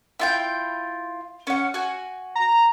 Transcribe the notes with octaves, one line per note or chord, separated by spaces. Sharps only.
E4 F4 G5
C#4 F#5
F#4 G#5
A#5